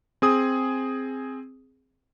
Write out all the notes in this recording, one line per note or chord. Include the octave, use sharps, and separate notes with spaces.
C4 G#4 D#6